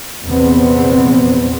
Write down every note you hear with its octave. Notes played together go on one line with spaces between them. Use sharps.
A#1 E2 C3 G3 B3 C4